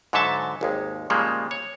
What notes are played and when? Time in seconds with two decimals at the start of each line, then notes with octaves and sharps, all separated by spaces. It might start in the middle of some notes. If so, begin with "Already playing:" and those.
0.13 G#2 D3 F#3 A4 E5 A5
0.61 G#1 D#2 G#3
1.10 A#2 C#3 F3 G3 G#3 A#3
1.51 C#5